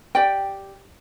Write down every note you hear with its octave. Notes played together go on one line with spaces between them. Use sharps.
G4 D5 G5